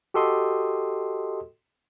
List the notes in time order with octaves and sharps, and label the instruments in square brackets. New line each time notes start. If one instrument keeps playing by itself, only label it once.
[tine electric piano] F#4 G4 A4 D#5 C6 D#6